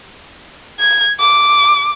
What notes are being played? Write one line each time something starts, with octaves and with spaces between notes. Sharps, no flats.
G#6
D6